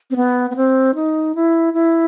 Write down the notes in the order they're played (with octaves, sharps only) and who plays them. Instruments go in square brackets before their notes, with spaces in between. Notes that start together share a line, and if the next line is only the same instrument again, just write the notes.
[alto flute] C4
B3
B3
C4
D#4
E4
E4